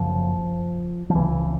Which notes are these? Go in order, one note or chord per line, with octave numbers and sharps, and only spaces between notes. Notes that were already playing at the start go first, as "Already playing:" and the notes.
Already playing: F#1 F#2 C#3 F3
F3
C#2 C#3 E3